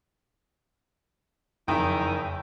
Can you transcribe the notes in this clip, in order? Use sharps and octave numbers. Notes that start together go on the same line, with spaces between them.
F#1 F2 D#3 E4 G5